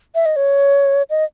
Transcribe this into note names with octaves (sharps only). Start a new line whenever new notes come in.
E5
D#5
C#5
D#5